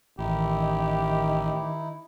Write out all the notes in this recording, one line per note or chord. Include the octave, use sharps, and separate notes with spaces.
A1 D#3 D#4 E4 G4